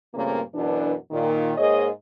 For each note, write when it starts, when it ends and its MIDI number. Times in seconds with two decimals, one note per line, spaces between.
0.15 0.40 43
0.15 0.40 46
0.15 0.40 49
0.15 0.40 57
0.15 0.40 58
0.15 0.40 60
0.55 0.93 42
0.55 0.93 47
0.55 0.93 52
0.55 0.93 62
1.11 1.53 46
1.11 1.53 51
1.58 1.88 44
1.58 1.88 58
1.58 1.88 68
1.58 1.88 73
1.58 1.88 75